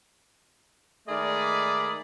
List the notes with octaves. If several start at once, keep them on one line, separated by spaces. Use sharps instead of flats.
D#3 G#3 A3 G#4 D5 B5